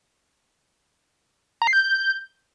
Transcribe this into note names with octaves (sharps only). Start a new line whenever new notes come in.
A#5
C7
G6